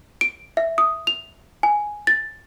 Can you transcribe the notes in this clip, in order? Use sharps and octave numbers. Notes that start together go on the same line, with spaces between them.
D7
E5
D#6
F7
G#5
A6